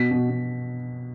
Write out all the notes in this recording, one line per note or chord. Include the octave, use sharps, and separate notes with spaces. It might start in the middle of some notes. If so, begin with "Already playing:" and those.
Already playing: B2 B6
B2
B2